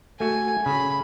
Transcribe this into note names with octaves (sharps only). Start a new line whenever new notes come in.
A3 F#4 G#5
C#3 B5